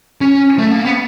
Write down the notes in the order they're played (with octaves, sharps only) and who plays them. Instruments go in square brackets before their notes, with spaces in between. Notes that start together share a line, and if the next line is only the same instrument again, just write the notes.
[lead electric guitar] C#4
A3
A#3
B3